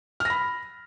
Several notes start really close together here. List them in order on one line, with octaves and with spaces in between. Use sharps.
F6 A#6 B5